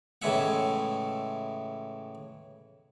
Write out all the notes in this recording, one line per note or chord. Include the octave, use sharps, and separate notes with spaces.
A2 C#3 E3 G#3 E5 F#5